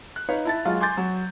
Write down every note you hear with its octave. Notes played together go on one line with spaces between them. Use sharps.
F#6
D#4 B4 C#5 F5
E4 A5 A6
F#3 G#3 F4
G#5 C6 D6 G6 A6
F#3